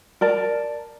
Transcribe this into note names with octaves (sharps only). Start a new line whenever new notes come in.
A#4 D5 A5